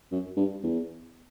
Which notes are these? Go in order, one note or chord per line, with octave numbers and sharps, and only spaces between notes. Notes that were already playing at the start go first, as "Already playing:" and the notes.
F#2
G2
E2